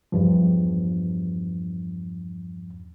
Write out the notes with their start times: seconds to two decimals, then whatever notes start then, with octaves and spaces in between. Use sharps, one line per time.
0.12 E2 G2 F3